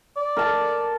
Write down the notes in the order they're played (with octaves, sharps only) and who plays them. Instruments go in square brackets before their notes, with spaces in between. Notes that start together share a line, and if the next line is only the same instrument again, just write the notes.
[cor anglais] D5
[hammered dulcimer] A#4 A5